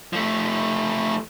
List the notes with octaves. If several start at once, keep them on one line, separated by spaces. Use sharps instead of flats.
F3 A3